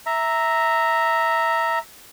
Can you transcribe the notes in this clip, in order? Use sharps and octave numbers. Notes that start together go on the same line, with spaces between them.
E5 A#5